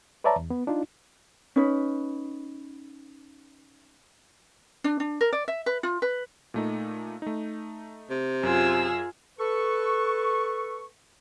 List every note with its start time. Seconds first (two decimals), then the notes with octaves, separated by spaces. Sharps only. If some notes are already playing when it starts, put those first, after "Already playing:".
0.24 B4 C#5 D5 E5 A5 A#5
0.36 E2
0.50 B3
0.67 D4 D#4 F4
1.56 C#4 D#4 B4
4.84 D4
5.00 D4
5.21 A#4
5.33 D5
5.48 E5
5.66 B4
5.83 F4
6.02 B4
6.54 A#2 A3 D#4
7.22 A3 D#4
8.10 C3
8.43 F#2 F4 G#4 E6
9.38 A4 B4 C#6